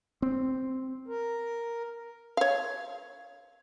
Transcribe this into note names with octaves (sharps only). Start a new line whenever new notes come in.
C4
A#4
C#5 F5